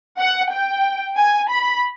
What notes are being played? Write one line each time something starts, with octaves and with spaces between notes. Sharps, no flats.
F#5
G5
G#5
B5